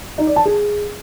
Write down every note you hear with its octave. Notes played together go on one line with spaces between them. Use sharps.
D#4
D5
A5
G#4